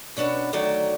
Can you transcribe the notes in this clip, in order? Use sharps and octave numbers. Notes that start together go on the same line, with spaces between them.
B2 C#4 D4 F#4 B4
D2 D#3 F#3 A3 F#4 D5